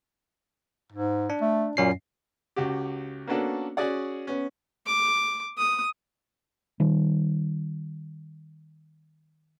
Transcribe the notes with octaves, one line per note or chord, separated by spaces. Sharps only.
G#2
D4
A3
F#2 A#2 C#4 C7
C#2 F#4 G4
A#3 B3 C#4 D4 F#4 A4
C#4 F#4 G#4 D5 F#5
B3 C#4
D6
D#6
D#3 G3